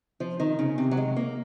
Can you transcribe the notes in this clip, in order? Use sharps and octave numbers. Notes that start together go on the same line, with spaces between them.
F3
D#3
C#3
C3
F#3
G#3
A#3